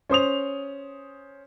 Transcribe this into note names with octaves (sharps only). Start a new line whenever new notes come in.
C#4 C5 D#6 F7